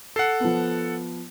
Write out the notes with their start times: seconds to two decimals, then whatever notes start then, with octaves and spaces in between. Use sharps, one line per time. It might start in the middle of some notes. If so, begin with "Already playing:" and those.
0.16 A4 F#5 C7
0.40 F3 B3